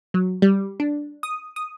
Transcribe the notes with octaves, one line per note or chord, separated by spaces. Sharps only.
F#3
G3
D4
D#6
D#6